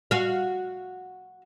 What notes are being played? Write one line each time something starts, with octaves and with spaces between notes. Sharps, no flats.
F#4 F5